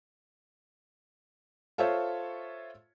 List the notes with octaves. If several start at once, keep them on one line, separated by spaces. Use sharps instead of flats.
F4 A4 C5 C#5 E5